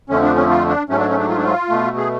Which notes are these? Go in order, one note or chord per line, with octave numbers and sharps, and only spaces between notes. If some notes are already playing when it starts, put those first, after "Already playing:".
F2 D3 F3 A3 C#4
D4
C#4
F4
D4
G#2 F#3 A3 C#4
D4
C#4
D4
F4
D4
F4
B2 A3
G#4